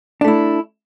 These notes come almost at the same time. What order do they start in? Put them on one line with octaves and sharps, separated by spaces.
D4 A3 E4